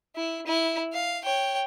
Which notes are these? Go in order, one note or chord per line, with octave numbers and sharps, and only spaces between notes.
E4
E4
F5
C#5 G5